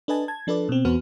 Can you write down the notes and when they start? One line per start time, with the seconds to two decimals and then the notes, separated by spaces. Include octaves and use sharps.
0.08 D4 A4 B4 D#5 G#5 A5
0.28 A5 G#6
0.47 F3 D4 A4 B4 D5
0.69 B2 C4
0.85 E2 B3 F#4 C5 F6